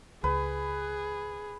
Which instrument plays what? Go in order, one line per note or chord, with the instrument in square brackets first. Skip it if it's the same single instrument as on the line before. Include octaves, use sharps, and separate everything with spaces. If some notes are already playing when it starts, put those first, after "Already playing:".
[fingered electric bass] C#2 [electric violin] G#4 [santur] B4